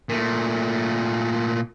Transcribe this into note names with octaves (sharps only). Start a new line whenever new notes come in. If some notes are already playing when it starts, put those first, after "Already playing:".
A#2 A3